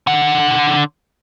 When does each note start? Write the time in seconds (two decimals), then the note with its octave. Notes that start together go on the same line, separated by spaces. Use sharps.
0.07 D3 F#5